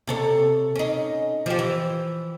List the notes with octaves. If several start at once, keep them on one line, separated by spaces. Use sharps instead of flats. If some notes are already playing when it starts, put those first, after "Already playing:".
C3 A4 C#5
C#4 D#4
F3 G4
E3